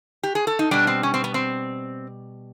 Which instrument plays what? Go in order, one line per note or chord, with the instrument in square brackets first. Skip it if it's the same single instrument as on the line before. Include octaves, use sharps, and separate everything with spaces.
[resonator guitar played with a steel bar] G4
G#4
A4
D#4
B2 G3 D4
C4
C#4
C4
B3
C4